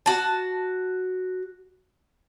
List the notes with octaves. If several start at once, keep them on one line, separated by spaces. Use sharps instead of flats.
F#4 A5